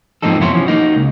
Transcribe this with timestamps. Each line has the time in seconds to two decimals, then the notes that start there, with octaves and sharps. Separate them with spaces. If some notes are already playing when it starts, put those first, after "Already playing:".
0.22 G#2 F3 A#3 C4 D#4 A4
0.40 F2 B2 E4 F#4 C#5 C6
0.54 E3 F3 C#4
0.66 A#3 D#4 F#4
0.96 C#2